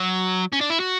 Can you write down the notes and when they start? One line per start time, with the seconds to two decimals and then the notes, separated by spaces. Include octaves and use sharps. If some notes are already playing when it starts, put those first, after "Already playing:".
Already playing: F#3
0.53 C#4
0.61 D4
0.70 E4
0.80 F#4